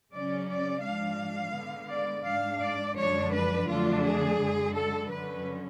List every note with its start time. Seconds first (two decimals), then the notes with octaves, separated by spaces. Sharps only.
0.12 C#3 F#3 C#4 D5
0.48 D5
0.83 G#2 F3 G#3 D4 F5
1.54 D3 G#3 B3
1.89 D5
2.25 G#2 G#3 D4 F5
2.62 D5
2.97 F#2 D3 F3 G#3 D4 C#5
3.32 B4
3.68 F2 D3 F#3 A3 D4 F4
4.04 G#4
4.39 F#2 D3 G#3
4.74 A4
5.10 F#2 D3 F#3 C#4 B4